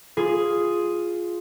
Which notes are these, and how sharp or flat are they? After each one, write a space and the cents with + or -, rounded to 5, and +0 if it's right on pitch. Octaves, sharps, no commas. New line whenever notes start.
F4 +0 G#4 +0